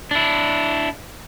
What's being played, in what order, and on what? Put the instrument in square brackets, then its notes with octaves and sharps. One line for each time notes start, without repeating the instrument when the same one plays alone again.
[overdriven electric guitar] D4 E4